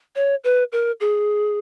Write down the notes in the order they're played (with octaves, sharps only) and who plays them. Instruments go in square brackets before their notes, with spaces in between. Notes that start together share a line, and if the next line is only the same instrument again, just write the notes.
[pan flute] C#5
B4
A#4
G#4